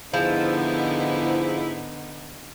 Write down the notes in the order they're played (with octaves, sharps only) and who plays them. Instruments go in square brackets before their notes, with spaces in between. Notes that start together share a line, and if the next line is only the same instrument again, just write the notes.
[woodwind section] G#2 [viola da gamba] D3 B3 D#4 [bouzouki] F3 [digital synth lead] E4